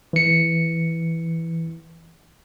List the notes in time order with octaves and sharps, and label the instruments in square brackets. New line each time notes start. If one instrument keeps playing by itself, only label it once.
[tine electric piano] E3 C#7